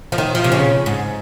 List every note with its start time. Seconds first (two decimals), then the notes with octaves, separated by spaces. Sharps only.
0.12 F3
0.18 D#3
0.35 F3
0.44 C3
0.52 C#3
0.86 G#2